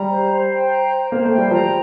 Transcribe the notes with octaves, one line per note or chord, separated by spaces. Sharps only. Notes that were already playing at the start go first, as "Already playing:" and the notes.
Already playing: G3 A#5
C5
C5
G5
A#5
C5
A#3 C5
A3
G5
G3
F3 A#5